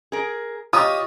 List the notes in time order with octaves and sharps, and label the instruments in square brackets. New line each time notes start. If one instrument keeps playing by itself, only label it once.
[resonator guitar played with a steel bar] G#4 A#4
[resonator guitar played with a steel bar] F4 [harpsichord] G4 C#5 D#5 [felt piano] D#6